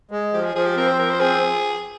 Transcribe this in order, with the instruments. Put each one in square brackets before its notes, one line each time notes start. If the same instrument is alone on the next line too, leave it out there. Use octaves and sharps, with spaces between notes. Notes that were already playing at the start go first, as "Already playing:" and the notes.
[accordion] G#3
[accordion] F3 [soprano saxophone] G4
[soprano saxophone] G#4
[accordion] F3 [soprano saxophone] G#4
[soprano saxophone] G4
[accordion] C4 [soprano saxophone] A#4
[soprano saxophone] C5
[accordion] F3 [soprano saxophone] A#4
[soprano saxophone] C5
[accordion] C4 [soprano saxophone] G#4